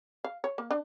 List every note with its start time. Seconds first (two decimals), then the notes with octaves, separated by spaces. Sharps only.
0.24 F5
0.44 C#5
0.58 A#3
0.71 D4